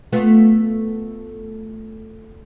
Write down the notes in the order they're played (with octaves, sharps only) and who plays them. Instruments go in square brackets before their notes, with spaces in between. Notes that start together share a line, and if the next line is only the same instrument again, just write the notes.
[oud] A3 B3 F4